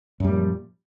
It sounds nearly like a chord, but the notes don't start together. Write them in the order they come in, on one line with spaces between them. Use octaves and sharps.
F#2 G3 A#2 F3